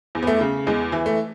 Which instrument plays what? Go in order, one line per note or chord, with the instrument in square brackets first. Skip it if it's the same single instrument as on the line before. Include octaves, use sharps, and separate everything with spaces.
[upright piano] E2
B3
A3
C#3
E2 G#3
E3
A3